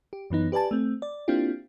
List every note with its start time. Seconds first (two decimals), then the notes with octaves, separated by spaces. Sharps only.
0.13 G4
0.30 F#2 E3 B3 D#4
0.52 G4 B4 D5 G#5 A5
0.71 A3 C4
1.02 D5
1.28 A#3 C4 D4 E4 F4 G4